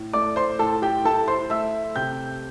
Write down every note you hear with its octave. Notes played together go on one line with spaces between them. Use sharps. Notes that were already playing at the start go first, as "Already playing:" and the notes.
Already playing: A2
A3 D5 D6
C5 C6
A2 A4 A5
G4 G5
E4 A4 A5
C5 C6
A3 E5 E6
C3 G5 G6